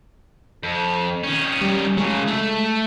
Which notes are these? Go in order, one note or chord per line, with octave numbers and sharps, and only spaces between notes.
F2
D#3 C#4
G3
C#3 F#3 G#3
A3